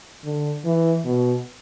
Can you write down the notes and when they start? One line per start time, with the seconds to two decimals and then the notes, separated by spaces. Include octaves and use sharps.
0.24 D3
0.65 E3
1.05 B2